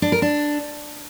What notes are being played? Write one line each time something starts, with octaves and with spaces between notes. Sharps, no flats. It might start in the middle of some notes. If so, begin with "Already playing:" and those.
D4
A#4
D4